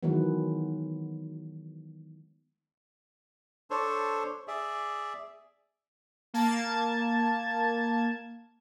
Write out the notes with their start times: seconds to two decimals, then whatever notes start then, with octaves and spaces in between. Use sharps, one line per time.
0.03 D#3 E3 F#3 G#3 B3
3.71 D4 A4 C5 C#5
4.48 G#4 D5 E5
6.34 A#3 A5 G#6